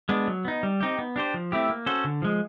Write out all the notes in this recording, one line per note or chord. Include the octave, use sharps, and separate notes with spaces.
G#3 B3 D4
F#3
B3 D#4
G3
C4 D#4 G4
B3
D4 G4 C5
F3
A3 C4 E4 G4
A#3
C#4 F#4 A4 C5
D3
F3 G#3